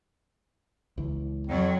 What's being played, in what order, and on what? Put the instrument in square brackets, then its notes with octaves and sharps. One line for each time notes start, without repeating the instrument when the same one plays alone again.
[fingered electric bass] C#2 E3
[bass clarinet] F2 [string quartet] F#3